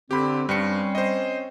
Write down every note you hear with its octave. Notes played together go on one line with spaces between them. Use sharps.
D3 C4 G4 B5
G2 G3 C4 C#4 C#7
C5 D#5